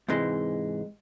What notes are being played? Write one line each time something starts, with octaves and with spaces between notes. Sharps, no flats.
G#2 C3 E3 G#3